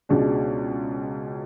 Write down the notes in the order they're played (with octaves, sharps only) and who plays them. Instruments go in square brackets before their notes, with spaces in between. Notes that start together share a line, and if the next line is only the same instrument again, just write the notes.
[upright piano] C#2 B2 G#3 D4